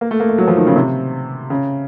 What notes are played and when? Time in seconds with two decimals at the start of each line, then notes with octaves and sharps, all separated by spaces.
0.01 A#3
0.11 A3
0.20 A#3
0.29 A3
0.38 F#3
0.48 F3
0.57 D#3
0.67 C#3
0.76 C3
1.50 C#3